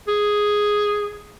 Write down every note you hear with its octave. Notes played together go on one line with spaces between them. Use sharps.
G#4